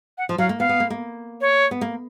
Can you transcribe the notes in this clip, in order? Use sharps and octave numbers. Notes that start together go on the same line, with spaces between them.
F#5
F3
F#3 F5
A#3
B3 F5
B3
A#3
A#3
C#5
B3
A#3